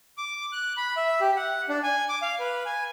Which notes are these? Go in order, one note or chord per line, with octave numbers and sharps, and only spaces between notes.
D6
F#6
B5
E5
G4
F#5
D4
G#5
D6
F5
B4
G#5